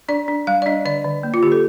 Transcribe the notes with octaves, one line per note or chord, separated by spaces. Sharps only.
D4 D5
D4
G3 F5
D5
D4 D#5
D3 D5
D3
A#3
F4
D3 G4
A4